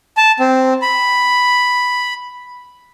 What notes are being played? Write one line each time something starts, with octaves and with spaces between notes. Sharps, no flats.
A5
C4
B5